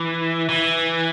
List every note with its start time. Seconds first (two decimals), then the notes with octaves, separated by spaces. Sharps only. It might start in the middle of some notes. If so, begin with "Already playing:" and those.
Already playing: E3
0.49 E3